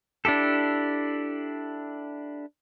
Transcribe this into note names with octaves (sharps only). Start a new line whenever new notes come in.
D4 E4 G4 A4